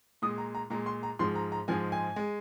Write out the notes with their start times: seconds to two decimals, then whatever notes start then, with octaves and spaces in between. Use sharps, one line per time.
0.22 A#2 G#3 D#6
0.38 A#5
0.55 A#5
0.70 A#2 G#3 A#5
0.86 C6
1.03 A#5
1.19 G#2 F3 G#3 C6
1.35 A#5
1.52 A#5
1.68 G#2 F3 G#3 G#5
1.92 G#5
2.16 G#3